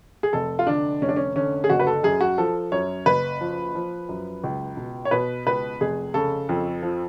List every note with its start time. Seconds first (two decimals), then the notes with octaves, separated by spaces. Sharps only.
0.23 G#4
0.33 F1 A4
0.59 F4
0.67 D3 D4
1.02 F1 C#4
1.09 D4
1.16 C#4
1.36 D3 C#4
1.64 G#4
1.70 F#1 F#4
1.80 B4
1.87 A4
2.03 F#2 G#4
2.21 F#4
2.38 F3 A4
2.72 F#2 C#5
3.06 F#1 B4
3.41 F3
3.75 F3
4.09 F#2
4.44 C#2
4.77 B2
5.05 C#5
5.11 B2 B4
5.47 C#2 B4
5.81 F1 G#4
6.14 C#3 A4
6.49 F2
6.83 F3